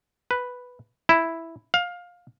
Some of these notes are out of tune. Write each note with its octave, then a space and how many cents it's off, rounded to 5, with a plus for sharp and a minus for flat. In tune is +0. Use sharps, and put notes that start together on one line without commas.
B4 +0
E4 +0
F5 +20